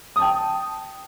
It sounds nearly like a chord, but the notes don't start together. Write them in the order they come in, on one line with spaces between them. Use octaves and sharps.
D#6 A5 G5